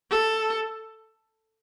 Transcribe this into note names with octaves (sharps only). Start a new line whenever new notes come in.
A4